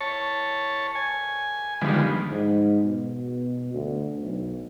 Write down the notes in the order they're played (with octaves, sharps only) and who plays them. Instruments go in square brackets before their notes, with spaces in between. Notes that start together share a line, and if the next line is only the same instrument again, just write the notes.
[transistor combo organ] C#5 A5
G#5
D3 D#3 F3 G3 G#3 B3
[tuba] G#2
B2
D2
B1